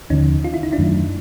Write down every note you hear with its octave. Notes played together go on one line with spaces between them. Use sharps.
D#2 D3 F3 C#4 D#4
F4
E4
D#4
D4 E4
F#2 D#3 F#3 A3